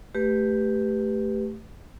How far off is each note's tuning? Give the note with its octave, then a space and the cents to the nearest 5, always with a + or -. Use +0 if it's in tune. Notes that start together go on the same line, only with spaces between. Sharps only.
A3 +0 G4 +0 B4 +0